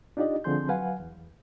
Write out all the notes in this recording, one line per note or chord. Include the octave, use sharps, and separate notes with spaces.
D4 D#4 F4 G4 D5 D#5
D3 F3 C4 G#4 C6 G6
F#3 B4 F5 F#5 G#5
E2